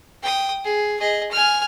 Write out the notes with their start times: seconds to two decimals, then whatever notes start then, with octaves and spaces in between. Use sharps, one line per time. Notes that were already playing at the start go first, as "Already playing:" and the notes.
0.23 G5 D#6
0.65 G#4
1.00 G#4 D#5
1.31 G#5 F6